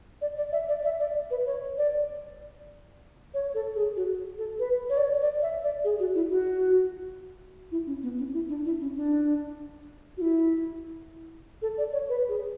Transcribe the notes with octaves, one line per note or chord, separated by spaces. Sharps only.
D5
D5
E5
D5
E5
D5
B4
C#5
D5
C#5
A4
G#4
F#4
A4
B4
C#5
D5
C#5
D5
E5
D5
G#4
F#4
E4
F#4
E4
C#4
B3
C#4
E4
D4
E4
C#4
D4
F#4
E4
A4
D5
C#5
B4
G#4